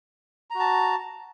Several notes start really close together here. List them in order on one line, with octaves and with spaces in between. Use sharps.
A#5 F#4 A5